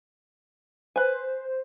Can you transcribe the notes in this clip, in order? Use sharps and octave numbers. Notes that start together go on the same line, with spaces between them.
B4 C5 G#5